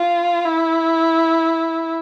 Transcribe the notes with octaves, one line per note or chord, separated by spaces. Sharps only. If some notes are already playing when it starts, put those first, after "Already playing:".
Already playing: F4
E4